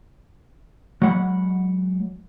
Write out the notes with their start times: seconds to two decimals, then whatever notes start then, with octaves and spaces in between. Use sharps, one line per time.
1.02 F#3 G#3 F#5 B5